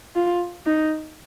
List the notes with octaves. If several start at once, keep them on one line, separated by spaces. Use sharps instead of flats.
F4
D#4